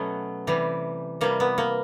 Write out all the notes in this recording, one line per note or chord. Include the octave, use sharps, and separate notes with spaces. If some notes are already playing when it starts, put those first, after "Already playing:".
Already playing: B2 F#3 A3 B3 C#4
C3 E3 G3
C3 E3 G3 A#3
B3
A#3